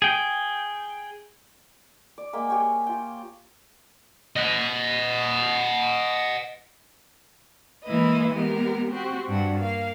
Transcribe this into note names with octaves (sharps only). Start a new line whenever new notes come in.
G#4 G5
D5
G#3 A#3 E5 G5
G4 C#5 G5 G#5
F4 G5
D#5 F#5
E3 G#3 A#3 E4 B4 D#5
G#3 B3 G4 A#4
C4 F#4 G4
G2 D4 F#4
A#3 F5